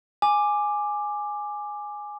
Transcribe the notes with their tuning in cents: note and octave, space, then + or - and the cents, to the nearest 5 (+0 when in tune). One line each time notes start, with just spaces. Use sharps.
G#5 +0 D6 +10